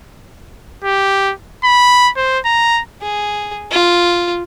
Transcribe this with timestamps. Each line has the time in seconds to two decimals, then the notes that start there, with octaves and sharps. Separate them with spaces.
0.84 G4
1.64 B5
2.16 C5
2.45 A#5
3.02 G#4
3.71 F4